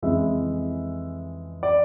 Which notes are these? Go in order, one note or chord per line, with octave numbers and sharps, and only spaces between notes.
F2 C#3 E3 G#3 E5
D5